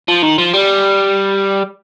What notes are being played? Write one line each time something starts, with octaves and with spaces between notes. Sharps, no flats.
F3
D#3
F3
G3